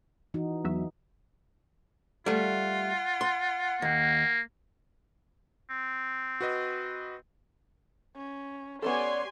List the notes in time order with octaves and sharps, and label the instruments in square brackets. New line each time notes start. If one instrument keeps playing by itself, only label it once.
[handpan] E3 D#4 F#4
[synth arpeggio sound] E2 F#3 E5
[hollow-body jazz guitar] G3 A3 [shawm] F4 [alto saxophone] F#5
[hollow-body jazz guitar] C6
[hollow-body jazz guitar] D#2 [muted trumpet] A#3
[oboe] C4
[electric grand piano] F#4 B4 D#5
[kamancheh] C#4
[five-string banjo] B3 C#4 A4 [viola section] G4 G#5 C6 [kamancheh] C#5 [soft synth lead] D5